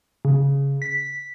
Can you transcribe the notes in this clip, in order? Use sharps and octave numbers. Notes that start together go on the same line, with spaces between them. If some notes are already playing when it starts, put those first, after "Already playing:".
C#3
B6